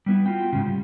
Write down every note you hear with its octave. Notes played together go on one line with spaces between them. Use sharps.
G3 B3 E4
F4 F#4 G5
G#2 C#3
G3